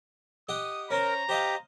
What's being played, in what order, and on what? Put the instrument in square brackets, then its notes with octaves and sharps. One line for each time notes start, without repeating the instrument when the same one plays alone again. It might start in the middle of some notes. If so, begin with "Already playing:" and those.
[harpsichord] G4 D#5 F#5 [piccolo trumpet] D#6
[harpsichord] C#4 C5 [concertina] A#4 [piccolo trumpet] A#5
[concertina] G4 [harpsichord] C5 D#5 F5